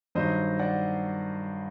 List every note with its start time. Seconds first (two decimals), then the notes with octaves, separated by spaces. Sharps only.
0.15 G2 D#3 F#3 C5 D#5
0.59 D5 F#5